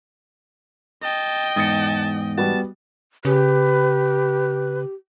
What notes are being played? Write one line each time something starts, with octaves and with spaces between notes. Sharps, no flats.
D#5 G5 A5
E2 G#2 A5 D#6 A6 C#7
G3 B3 F#4 A5
C#3 G4 B4